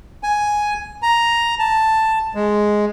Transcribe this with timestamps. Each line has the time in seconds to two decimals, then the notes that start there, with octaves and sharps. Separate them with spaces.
0.23 G#5
1.02 A#5
1.59 A5
2.35 G#3